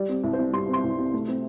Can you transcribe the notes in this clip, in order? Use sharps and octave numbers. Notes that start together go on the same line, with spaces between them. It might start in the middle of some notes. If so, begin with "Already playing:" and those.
Already playing: G3 D5
C4
C2
C5
C3
G3 C6
C4
C6
C2
C3
A3
C4